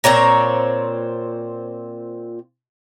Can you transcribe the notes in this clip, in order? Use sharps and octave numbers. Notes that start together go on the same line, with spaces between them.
A#2 C4 C#5 A#5